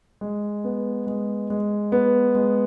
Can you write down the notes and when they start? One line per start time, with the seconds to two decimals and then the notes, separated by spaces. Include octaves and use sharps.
0.21 G#3
0.64 B3
1.07 G#3
1.50 G#3
1.92 B3
2.35 G#3